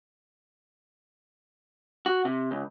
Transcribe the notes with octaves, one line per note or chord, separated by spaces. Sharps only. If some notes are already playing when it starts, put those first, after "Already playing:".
F#4
C3
C#2